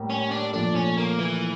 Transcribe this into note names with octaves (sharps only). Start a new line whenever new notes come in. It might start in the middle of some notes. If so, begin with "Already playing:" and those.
Already playing: A2 G3 A#3
C#4
D4
A#2 F3 A3 D4
C#4
A#3
E3